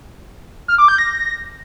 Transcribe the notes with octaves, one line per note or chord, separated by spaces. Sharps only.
F6
D6
G6
A#6